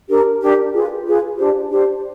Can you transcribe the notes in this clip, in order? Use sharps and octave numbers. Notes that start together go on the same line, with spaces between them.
D4 G4 A#4
D4 G4 A#4
F4 G#4 B4
F4 G#4 B4
D4 G4 C5
D4 G4 C5